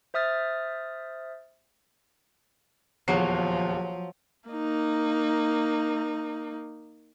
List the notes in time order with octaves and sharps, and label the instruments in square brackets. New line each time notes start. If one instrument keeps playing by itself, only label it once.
[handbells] C5 E5 D#6 F6 A6
[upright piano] D#1 E2 C7 [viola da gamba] F3 [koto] F#3
[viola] A#3 D#4